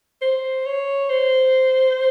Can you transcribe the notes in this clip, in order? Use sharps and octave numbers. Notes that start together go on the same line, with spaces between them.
C5
C#5
C5